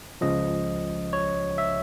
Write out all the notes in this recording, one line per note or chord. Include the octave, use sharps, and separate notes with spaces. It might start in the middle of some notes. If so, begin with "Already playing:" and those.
C#2 C#3 F3 D#5
C#5
E5